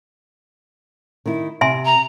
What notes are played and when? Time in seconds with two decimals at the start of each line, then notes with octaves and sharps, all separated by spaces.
1.26 D#3 E4
1.61 C3 E5 G#5 C6
1.85 A#5